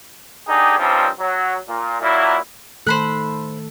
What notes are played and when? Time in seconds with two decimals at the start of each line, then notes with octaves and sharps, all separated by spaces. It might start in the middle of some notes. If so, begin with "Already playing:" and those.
0.48 D3 D#4 G4 G#4
0.79 G2 F3 G3 C4 C#4 D#4
1.19 F#3
1.68 A#2
2.01 A#2 F#3 E4
2.87 D#3 A3 A4 C5 B5 F#6